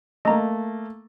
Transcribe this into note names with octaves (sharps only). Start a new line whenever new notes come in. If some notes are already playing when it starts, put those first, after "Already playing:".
A3 A#3 D#5 A#5